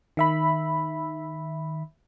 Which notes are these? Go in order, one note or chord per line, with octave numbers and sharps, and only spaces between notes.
D#3 E5 B5